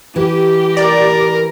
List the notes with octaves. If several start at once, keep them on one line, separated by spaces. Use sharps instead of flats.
E3 G4
A#4 D5